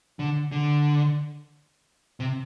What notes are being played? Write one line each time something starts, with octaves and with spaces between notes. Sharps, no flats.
D3
D3
C3